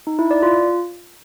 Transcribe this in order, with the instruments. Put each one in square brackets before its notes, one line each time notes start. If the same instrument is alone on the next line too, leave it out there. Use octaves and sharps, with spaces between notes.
[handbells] D#4
E4
D5
F4